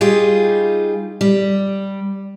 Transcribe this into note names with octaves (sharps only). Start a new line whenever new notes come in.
G3 D#4 F4 G4 G#4
G3